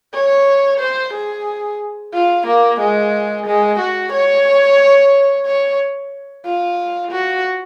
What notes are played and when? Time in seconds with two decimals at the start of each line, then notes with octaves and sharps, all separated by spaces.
0.14 C#5
0.80 C5
1.14 G#4
2.14 F4
2.47 A#3
2.80 G#3
3.46 G#3
3.80 F#4
4.12 C#5
5.46 C#5
6.45 F4
7.12 F#4